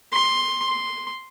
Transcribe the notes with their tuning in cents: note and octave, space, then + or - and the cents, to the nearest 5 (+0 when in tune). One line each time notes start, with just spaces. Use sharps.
C6 +10
C6 +0